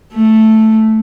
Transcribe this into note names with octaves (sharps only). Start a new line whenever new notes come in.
A3